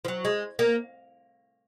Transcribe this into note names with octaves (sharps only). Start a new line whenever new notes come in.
F3
F#3
G#3
A#3